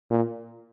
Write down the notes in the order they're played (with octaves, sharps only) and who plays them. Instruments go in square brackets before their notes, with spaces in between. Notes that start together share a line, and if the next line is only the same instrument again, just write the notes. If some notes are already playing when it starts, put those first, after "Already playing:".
[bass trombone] A#2